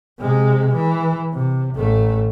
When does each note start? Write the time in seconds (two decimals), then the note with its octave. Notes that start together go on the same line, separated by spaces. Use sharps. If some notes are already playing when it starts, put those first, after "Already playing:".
0.19 C3 G#3
0.75 E3
1.33 C3
1.75 A1 A3